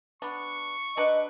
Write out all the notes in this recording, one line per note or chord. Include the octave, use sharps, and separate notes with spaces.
B3 D4 C#6
F#3 D4 B4 D#5